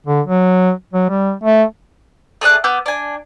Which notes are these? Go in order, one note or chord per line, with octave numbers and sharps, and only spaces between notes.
D3
F#3
F#3
G3
A3
A3 G#4 D5 F#6
B3 D6 E6 G6
D4 G#5